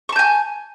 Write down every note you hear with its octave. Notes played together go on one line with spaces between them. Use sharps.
G#5 A5 C#6 G6